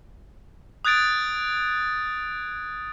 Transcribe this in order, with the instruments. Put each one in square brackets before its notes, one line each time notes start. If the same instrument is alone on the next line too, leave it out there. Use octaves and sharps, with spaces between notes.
[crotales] D#6 F#6 G#6 A6 D7